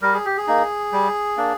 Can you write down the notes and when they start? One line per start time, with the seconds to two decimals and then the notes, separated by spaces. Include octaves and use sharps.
0.02 G3 A#4
0.14 G#4
0.25 G4
0.37 G#4
0.47 A#3 D#4
0.92 G3
1.37 A#3 D4